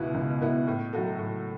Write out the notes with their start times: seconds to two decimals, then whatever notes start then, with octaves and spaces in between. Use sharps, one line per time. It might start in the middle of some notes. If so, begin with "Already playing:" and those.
Already playing: C#2 B2 B3 E4
0.14 C#2
0.40 B2 B3 E4
0.67 A2
0.93 F#3 A3 F#4 A4
1.19 A2